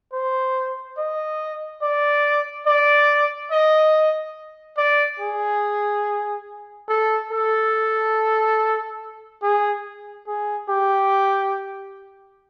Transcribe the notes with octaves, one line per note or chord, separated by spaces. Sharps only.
C5
D#5
D5
D5
D#5
D5
G#4
A4
A4
G#4
G#4
G4